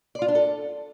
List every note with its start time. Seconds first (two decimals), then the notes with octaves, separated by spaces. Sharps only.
0.15 D5
0.22 F4
0.28 D4
0.35 A4